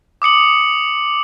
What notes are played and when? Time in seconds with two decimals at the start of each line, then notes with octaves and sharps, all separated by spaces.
0.22 D6 D#6 C#7 F#7